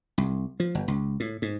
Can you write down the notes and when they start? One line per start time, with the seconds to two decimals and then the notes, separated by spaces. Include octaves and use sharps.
0.18 C2
0.60 F3
0.75 G1
0.88 C#2
1.20 A2
1.42 G#2